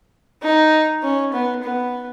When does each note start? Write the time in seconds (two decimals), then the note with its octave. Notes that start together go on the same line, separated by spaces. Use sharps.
0.43 D#4
1.03 C#4
1.33 B3
1.63 B3